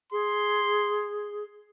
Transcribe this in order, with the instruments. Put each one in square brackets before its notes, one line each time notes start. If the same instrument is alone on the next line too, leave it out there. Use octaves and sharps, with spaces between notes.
[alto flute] G#4 [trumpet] C6